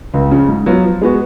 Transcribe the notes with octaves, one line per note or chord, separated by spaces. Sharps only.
C#2
C#3 F3
G#2
F#3 B3 F4
F3
G#3 B3 F#4